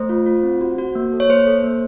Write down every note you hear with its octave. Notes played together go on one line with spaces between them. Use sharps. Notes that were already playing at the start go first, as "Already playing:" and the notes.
Already playing: A3 C5
F4
F4
C4
F#4
F#4
A#3
A4
C#5
A#3 C5
A4
A#3